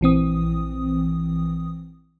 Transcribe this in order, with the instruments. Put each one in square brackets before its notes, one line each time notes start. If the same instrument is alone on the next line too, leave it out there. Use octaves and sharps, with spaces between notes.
[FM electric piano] A#1 E3 C4 D#6